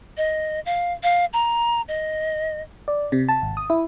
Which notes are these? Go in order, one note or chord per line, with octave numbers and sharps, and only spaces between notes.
D#5
F5
F5
A#5
D#5
D5
C3
A5
G#1
D#6
E4